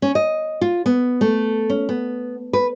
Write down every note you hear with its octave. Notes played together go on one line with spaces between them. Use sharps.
C#4
D#5
F4
B3
A3
C#4
B3
B4